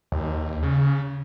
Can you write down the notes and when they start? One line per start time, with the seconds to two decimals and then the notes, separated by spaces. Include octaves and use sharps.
0.12 D#2
0.63 C#3